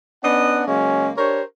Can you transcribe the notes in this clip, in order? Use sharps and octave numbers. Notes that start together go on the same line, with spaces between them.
B3 C#4 D4 D#5 F#5
C#3 F#3 G#3 A#3 C#4
D4 G4 A#4 C5 C#5